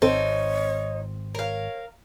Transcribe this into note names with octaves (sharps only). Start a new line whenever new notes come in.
G#1 C4 D#4 A4 C#5
A#4 C#5 F5